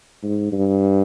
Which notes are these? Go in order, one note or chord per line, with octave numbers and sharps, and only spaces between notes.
G#2
G2